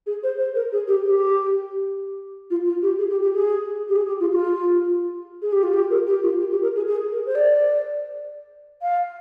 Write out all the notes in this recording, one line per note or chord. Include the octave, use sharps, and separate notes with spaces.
G#4
C5
C5
A#4
G#4
G4
G4
F4
F4
G4
G#4
G4
G4
G#4
G4
G#4
G4
F4
F4
G#4
G4
F4
G4
A#4
G4
F4
G4
G4
A#4
G#4
G#4
A#4
C5
D5
F5